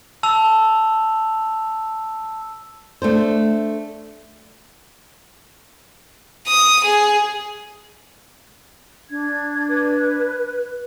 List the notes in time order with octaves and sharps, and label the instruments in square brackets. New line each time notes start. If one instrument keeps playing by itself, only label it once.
[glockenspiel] A5 E6 F7
[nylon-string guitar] A3 D4 C5
[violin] D#6
G#4
[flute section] D4 G#6
[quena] B4